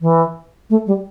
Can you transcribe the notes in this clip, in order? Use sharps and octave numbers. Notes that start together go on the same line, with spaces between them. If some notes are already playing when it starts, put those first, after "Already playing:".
E3
A3
G3